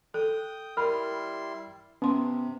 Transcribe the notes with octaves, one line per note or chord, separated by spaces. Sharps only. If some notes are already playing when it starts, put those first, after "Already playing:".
A4 G5 D#6
G3 E4 A#4 B5 C6 F6
C3 B3 C#4 C6